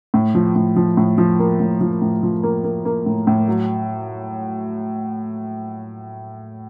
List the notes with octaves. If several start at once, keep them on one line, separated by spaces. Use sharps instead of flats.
A2
F3
A2
F3
A2
F3
A#3
A2
F3
A2
F3
A#3
A#3
A#3
A2
A2
F#3